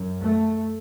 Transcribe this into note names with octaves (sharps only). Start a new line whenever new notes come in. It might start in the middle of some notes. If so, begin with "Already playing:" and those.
Already playing: F#2
A3